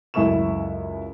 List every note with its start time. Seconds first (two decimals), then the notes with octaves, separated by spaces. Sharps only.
0.14 C#2 F#2 E4 A4 C#6 E7